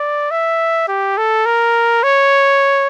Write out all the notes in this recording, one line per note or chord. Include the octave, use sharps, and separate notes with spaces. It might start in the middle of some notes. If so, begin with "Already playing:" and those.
Already playing: D5
E5
G4
A4
A#4
C#5